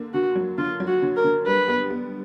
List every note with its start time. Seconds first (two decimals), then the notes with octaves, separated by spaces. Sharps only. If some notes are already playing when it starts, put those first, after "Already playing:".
Already playing: D3 A#3
0.13 D3 F#4
0.36 F#3
0.58 D3 F4
0.80 F#3
0.87 F#4
1.02 D3
1.17 A#4
1.24 D3
1.47 G3 B4
1.68 B3
1.90 B3